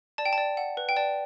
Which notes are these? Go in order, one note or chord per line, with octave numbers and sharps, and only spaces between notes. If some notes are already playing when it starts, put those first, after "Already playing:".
D5 A5
G5
A5
D5
F#5
B4
G5
D5 A5